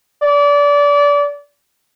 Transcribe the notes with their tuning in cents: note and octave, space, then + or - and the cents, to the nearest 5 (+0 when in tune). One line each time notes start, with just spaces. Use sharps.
D5 -25